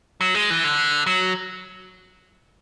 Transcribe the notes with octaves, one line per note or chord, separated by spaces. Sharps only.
F#3
G#3
E3
D3
F#3